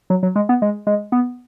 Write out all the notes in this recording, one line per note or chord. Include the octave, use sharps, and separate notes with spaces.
F#3
F#3
G#3
B3
G#3
G#3
B3